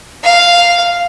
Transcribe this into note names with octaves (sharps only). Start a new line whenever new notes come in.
F5